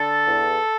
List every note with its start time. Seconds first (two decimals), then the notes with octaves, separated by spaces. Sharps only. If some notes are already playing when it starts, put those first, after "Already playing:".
Already playing: D3 A4
0.27 E2